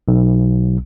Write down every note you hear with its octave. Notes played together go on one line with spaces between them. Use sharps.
B1